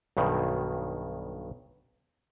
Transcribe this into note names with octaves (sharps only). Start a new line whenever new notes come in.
B1 G2 B2 D#3